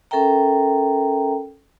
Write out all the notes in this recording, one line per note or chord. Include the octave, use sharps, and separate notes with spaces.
C#4 A4 A#4 E5 G5 A#5